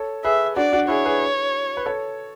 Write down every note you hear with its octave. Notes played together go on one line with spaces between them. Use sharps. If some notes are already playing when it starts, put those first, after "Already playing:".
Already playing: A4 C#5
G#4 B4 E5
D4 F#4 D5
D4 F#4
E4 G#4 C#5
G#4 B4
B4
A4 C#5